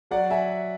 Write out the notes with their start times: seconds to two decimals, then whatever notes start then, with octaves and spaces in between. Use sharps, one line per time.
0.11 F#3 D5 F#5
0.30 E5 G#5